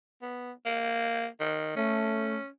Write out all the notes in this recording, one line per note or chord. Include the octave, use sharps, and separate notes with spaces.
B3
A#3
D#3
A3 C#4